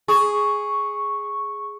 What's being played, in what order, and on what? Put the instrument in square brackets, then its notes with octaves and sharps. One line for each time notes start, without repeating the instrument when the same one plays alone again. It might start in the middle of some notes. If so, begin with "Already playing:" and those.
[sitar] G#4 [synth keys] C#6